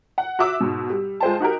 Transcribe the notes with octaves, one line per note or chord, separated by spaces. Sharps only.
F#5
F#4 E5 D6 E6
G#2 B2
G3
G#3 F4 C5 G5 A5
D#4 F#4 G4 A#4